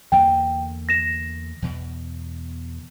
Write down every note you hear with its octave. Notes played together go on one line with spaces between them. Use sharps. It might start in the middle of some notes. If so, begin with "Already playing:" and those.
E2 D3 A#3 G5
A#6 E7
E2 B2